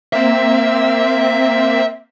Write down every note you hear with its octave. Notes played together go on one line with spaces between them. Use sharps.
A#3 C4 E5